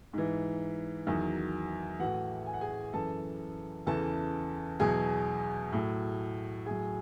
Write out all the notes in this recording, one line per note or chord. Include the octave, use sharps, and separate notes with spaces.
G#2 E3
E2 D#3 F#3
A2 E3 F#4 F#5
G#5
F#5
G#4 G#5
F#2 E3 A4 A5
E2 C#3 E3 A4 A5
E2 B2 F#3 G#4 G#5
A2 F#3
A2 F#3 G#4 G#5